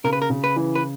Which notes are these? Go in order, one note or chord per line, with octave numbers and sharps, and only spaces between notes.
C#3 A#4
B4
A#4
C#3
B4
E3
B4